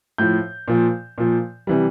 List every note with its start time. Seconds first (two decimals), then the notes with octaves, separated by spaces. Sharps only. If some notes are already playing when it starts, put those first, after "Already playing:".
0.18 A2 F3 G6
0.68 A#2 F3
1.18 A#2 F3
1.67 C3 E3 G3